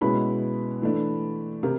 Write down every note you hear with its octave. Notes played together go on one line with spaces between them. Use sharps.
B2 G#3 C#4 E4 B4 B5
E3 A3 D4
C3 A#4